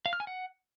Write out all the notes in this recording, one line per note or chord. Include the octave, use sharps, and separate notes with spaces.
F5
F6
G#5
F#5